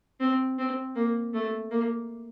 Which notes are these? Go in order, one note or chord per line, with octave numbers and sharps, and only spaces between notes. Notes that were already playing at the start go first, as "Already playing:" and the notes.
C4
C4
A#3
A3
A#3